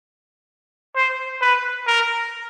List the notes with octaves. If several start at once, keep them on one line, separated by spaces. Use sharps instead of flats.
C5
B4
A#4